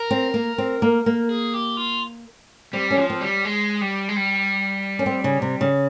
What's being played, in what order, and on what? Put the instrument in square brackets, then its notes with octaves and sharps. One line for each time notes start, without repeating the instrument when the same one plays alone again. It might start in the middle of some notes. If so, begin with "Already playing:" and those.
Already playing: [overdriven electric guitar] A#4
[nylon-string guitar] C4
A#3
C4
A#3
A#3
[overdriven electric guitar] G#4
G4
F4
[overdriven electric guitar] G3 [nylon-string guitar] C4
[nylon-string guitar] C#4
[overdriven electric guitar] F3
[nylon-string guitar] C4
[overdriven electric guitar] G3
G#3
G3
G#3
G3
[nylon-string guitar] C#4
C4
C#3
C3
C#3